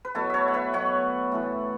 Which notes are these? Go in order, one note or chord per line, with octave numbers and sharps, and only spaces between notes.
B4
B2 F#3 A3 E4 A4
A4 C#5 E5
F#5
B4 E5
B2 F#3 A3 C#5 F#5
A2 E3 A3